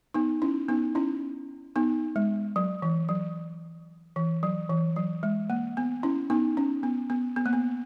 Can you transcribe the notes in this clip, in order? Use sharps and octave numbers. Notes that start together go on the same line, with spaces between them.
B3 D#4
C#4 E4
B3 D#4
C#4 E4
B3 D#4
G#3
F#3
E3
F#3
E3
F#3
E3
F#3
G#3
A#3
B3
C#4 E4
B3 D#4
C#4
B3
B3
B3
A#3
B3